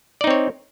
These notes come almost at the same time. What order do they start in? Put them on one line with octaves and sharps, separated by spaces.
D5 D#4 C4 C#5